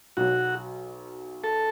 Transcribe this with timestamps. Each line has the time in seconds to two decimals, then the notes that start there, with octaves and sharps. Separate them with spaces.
0.17 B1 B2 F#3 F#4
1.44 A4